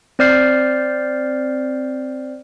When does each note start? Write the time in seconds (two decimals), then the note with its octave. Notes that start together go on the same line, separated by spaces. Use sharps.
0.19 C4 C5 D5 F6 G6 C7